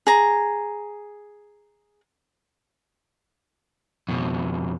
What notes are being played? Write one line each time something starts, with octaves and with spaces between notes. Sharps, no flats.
G#4 A#5
F2 B2